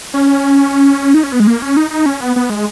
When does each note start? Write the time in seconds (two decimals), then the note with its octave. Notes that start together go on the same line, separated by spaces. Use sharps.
0.14 C#4
1.14 D#4
1.23 C#4
1.32 B3
1.40 G#3
1.47 A#3
1.62 C#4
1.77 D#4
1.91 D#4
2.06 C#4
2.20 B3
2.36 B3
2.50 G#3